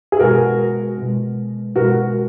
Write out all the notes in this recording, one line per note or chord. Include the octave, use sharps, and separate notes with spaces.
G#4
B2 G#3 F#4 A#4
B2 G#3
B2 G#3 F#4 A#4